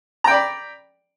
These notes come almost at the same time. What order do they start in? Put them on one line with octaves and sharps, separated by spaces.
A#5 G5 D5 B5